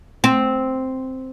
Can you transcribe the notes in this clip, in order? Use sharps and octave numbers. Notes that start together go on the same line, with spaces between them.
C4